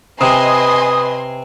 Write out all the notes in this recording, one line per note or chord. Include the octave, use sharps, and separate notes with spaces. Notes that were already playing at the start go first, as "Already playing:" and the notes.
C3 B4 D#5 G#5 C6 D#6